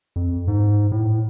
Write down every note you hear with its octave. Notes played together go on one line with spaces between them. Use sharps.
F2
G#2
A2